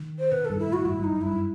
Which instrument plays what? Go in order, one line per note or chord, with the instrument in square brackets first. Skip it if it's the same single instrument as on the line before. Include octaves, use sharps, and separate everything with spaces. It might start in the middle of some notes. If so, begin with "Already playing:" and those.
Already playing: [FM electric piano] D#3
[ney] C5
[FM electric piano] B2 [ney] B4
[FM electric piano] G2 [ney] A4
[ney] E4
[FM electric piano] A2 [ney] F#4
[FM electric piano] G2 [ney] E4
[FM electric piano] G2 [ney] D#4
[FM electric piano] F#2
[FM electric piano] G2 [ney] E4